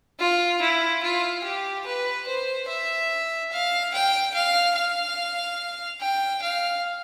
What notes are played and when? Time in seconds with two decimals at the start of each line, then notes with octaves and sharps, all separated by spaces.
0.20 F4
0.61 E4
1.03 F4
1.44 G4
1.86 B4
2.27 C5
2.69 E5
3.52 F5
3.94 G5
4.34 F5
4.76 F5
6.01 G5
6.42 F5